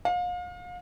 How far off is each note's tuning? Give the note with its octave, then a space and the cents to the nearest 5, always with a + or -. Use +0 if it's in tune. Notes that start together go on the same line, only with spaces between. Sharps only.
F5 +35